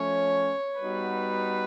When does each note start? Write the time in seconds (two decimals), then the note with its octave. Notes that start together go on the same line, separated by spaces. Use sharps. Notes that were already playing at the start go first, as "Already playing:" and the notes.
Already playing: F3 A3 C#4 C#5
0.80 G3 B3 D#4 F#4 B4